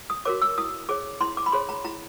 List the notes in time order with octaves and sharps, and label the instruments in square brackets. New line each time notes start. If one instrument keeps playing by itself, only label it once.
[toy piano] D#6
F#4 A#4 C#5 D6
E6
E4 D#6
G#4 C#5 D6
E4 C6
D6
B5
G#4 C#5 C6
A#5
E4 A#5